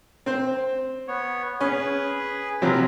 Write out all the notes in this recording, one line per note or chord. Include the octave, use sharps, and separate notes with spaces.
C4 C5
B3 C#5
C#4 G#4 B4
C3 F3 F#3 C4 A#4